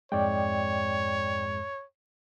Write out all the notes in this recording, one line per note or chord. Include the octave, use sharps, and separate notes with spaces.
F2 G#2 G#3 C#5 D5 G5